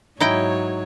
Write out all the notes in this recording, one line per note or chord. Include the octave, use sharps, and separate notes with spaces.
G#2 F#3 D#4 E4 C#5 G5